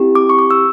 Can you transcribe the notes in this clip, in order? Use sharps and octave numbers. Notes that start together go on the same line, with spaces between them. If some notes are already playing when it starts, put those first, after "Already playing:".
Already playing: C4 E4 G4
D6
C#6
D6
E6